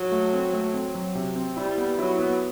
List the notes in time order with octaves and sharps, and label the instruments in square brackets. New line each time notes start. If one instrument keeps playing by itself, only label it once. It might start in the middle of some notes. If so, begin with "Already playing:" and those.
Already playing: [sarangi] F#3
[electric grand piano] A3
C4
A3
C4
F#3
C3
C4
[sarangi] G3 [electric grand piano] E4
[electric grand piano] B3
[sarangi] F#3 [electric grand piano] E4
[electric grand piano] B3